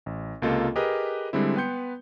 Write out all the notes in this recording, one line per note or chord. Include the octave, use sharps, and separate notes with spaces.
A1
C#2 C3 A#3 F4 A4 D#5
G4 G#4 A#4 B4 D#5
D3 G3 G#3 C4 E4
B3 B4 G5 C6 G6 C#7